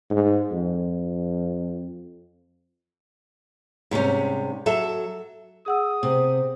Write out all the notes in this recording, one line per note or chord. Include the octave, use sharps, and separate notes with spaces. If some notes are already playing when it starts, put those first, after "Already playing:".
G#2
F2
G#2 C3 G3 C#4
F#3 A4 E5
G#4 F#5 D#6 E6
C3 C5